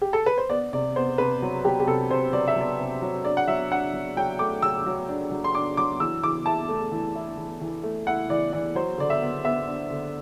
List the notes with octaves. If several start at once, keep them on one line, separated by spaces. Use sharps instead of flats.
G4
A4
B4
C5
B3 D5
C3 D5
B3 C5
C3 B4
F#3
F#3 G4
G4
C3 A4
C3 C5
F#3 D5
E5
F#3 D5
C3
F#3
D4 D5
F#5
F#3 E5
D4 F#5
F#3
F#3 G5
A3 D6
F#3 E6
F#3
D4
F#3
C6
D4 D6
F#3 D6
E3 E6
E3 D6
E4 A5
A3
E3
E4
E3
E3
A3
E4 F#5
E3 D5
E3 D5
F#3 C5
D3 D5
E5
B3
B3 E5
D4
D3